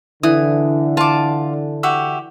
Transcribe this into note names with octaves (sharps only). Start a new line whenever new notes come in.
D3 E3 D#6
F4 A5 D6
F#4 G4 E5